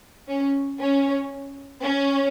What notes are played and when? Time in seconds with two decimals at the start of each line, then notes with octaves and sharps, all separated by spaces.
0.28 C#4
0.79 C#4
1.83 C#4